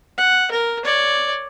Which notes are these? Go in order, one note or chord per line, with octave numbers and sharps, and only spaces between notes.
F#5
A#4
C#5 D5